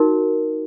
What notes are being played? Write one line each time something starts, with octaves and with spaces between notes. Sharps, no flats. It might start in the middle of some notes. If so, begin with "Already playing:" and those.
Already playing: D#4 F#4 A#4